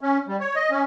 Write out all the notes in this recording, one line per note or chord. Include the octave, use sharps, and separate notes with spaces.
C#4
G3
C#5
D#5
C#4